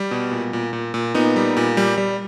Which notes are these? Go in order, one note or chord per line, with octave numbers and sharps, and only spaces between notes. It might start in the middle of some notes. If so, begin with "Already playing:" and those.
Already playing: G3
B2
A#2
A#2
A#2
A#2
A#2 B3 D#4
G3
A#2
G3
G3